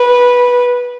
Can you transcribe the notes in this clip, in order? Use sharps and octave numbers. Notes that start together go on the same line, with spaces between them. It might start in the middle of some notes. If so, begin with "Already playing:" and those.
Already playing: B4